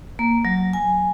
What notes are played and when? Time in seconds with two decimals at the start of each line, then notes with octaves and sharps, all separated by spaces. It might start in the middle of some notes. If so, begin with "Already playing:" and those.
0.19 A#3
0.45 F#3
0.73 G#5